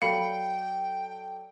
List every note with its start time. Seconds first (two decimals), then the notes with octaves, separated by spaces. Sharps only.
0.02 F#3 A4 D5 F5 G5 B5 C#7